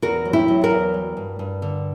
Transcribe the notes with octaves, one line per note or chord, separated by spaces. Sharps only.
E2 F#4 A#4
F#3
E4 G4
F#3
F#4 A#4
E2
G3
G2
G2
D3